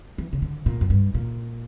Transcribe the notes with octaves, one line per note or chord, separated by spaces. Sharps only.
E3
C#3
D3
A#2
F#2
G2
A#2